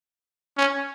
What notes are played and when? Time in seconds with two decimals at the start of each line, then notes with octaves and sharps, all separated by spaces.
0.57 C#4